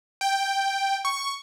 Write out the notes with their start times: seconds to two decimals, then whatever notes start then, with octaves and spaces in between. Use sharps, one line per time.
0.21 G5
1.05 C#6